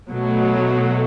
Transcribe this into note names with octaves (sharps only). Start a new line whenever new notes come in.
B2 F#3 A3